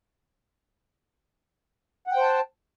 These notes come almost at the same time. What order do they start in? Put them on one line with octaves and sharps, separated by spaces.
F#5 G5 C5 A5